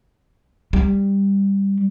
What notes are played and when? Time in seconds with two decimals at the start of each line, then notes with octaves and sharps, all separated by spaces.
0.73 G3